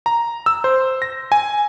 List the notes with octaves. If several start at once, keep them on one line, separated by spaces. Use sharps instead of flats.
A#5
E6
C5
A#6
G#5